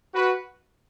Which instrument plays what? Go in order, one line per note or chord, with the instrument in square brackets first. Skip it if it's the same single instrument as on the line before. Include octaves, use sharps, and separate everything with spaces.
[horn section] F#4 B4